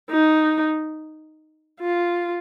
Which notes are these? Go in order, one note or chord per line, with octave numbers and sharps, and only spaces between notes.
D#4
F4